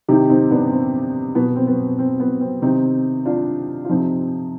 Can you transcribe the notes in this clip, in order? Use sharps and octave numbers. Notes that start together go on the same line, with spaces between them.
C3 D#3 D#4 G4
C4 D#4
B3 D4
C4
B2 B3
C4
B3
C4
B3
C4
C3 D#3 C4 D#4
D4 F4
F4
C3 F3 C4 D#4